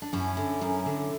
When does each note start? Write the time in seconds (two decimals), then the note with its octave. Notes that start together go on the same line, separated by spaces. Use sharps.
0.02 D4
0.13 F#2 C#4 E4
0.37 D3
0.61 F#2
0.86 D3